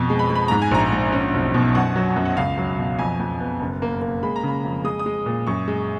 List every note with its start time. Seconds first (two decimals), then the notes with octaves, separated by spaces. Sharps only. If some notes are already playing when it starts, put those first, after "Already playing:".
Already playing: F2 B2
0.10 G#3
0.19 B5
0.30 G#3
0.35 B5
0.48 G#2 A#5
0.62 G#5
0.71 A#1 A#5
0.92 G#2
1.12 C#4
1.34 B1
1.54 B2
1.75 F#2 F#5
1.96 F#3
2.16 F#2
2.25 F#5
2.37 C#2 F5
2.57 F#3
2.78 B2
2.99 F2 G#5
3.19 F2
3.40 B3
3.61 F#1
3.82 A#3
4.02 A#3
4.23 G#3 B5
4.36 A#5
4.43 C#3 B5
4.64 F2
4.84 G#3 D#6
4.99 D#6
5.06 G#3
5.26 A#2
5.47 F#2 C#6
5.68 G#3